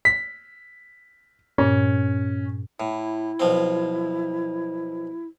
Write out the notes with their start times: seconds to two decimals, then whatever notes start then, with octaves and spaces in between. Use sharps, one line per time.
0.05 B6
1.58 G2 A#2 C#4
2.80 A2 E4
3.40 B1 F3 C4